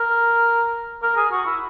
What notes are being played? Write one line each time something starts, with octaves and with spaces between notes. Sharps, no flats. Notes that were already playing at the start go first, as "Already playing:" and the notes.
Already playing: A#4
A#4
G#4
F#4
E4